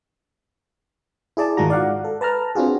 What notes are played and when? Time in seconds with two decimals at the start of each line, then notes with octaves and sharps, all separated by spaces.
1.37 E4 G#4 D5 A5
1.57 G#2 D#3 G#3 F4 F#4 A#5
1.70 D5 F5 F#5
2.05 A4
2.21 B4 A5 A#5 F6
2.55 C4 D4 F4 F#4 G#4